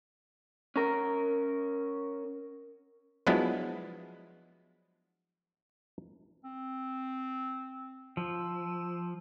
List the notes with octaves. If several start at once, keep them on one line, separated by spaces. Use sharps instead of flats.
C#4 A#4
F3 F#3 G#3 B3 D4 E4
C4
F3 E6